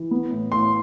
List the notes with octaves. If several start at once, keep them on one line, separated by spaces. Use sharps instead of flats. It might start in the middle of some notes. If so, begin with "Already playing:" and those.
Already playing: E3
B3
A2
A2 C6